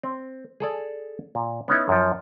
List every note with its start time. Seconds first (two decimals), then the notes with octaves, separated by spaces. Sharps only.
0.03 C4
0.60 G#4 A4 D5
1.35 A#2
1.68 B3 C#4 D#4 E4
1.89 F#2 F3